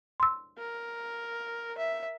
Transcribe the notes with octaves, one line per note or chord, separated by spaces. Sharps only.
C6 E6
A#4
E5